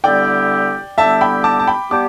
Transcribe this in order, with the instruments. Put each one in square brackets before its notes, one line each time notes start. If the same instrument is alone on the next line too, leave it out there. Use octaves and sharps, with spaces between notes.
[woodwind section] D3 G3 B3 E4 G4 [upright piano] D5 G5
[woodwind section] D3 G3 B3 E4 G4 [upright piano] E5 A5
[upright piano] G5 B5
A5 D6
A5
G5 B5
[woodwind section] G3 B3 G4 [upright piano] A5 D6